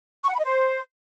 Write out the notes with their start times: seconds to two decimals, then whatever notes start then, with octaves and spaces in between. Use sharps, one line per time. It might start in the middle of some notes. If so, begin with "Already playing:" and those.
0.24 C#6
0.29 F#5
0.34 B5
0.39 D#5
0.44 C5